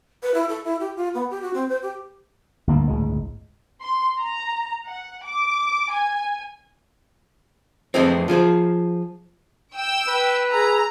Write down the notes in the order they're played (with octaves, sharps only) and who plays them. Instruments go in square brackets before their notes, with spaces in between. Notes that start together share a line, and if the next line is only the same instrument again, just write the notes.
[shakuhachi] B4
E4
A4
E4
G4
F4
B3
G4
F#4
C4
C5
G4
[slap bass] G1 D2 A#3
G1 C#2 A2 G#3
[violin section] C6
A#5
F#5
D6
G#5
[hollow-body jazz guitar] F2 E3 G#3 A3 C4
F3 F4 G#4 C5
[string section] G5 E6
[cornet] B4
[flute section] G#4 G#5 E6 [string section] A#5